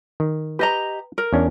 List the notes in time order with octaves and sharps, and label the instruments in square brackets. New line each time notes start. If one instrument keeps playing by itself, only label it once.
[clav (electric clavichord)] D#3
[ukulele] G4 D#5 A#5 [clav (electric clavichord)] B4
[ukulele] A#4
[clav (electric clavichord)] E2 C#4 D4